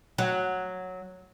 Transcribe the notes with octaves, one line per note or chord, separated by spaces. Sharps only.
F#3